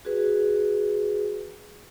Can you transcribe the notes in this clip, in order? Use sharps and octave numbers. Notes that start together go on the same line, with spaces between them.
F#4 G#4 B4